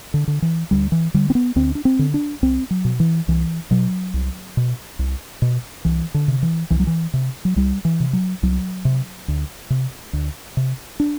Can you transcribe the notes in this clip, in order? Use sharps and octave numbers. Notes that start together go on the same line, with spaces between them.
D3
D3
E3
D2 G3
E3
D3 G3
C4
B3
D2 C4
D4
C4
D3
D4
C2 C4
F#3
B2
E3
C2 E3
B2 F#3
C2
B2
C2
B2
C2 E3
D3
C3
E3
C2 E3
F#3
E3
C3
F#3
C2 G3
E3
C3
F#3
C2 F#3
C3
D2
C3
D2
C3
D4